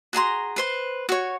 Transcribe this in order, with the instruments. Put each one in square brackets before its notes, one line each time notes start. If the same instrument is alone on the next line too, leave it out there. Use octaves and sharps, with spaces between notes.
[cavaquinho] F#4 G#4 A#5 C6
B4 C5 C6
F#4 C#5